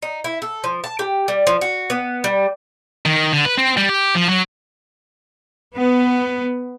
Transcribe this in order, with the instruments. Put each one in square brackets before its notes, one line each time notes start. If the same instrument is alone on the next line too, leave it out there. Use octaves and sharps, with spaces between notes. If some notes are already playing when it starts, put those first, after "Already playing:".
[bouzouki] D#4
E4
A4
F3
A5
G4
G3
F3
F#4
B3
G3
[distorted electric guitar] D#3
D3
B4
C4
G3
G4
F3
F#3
[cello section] B3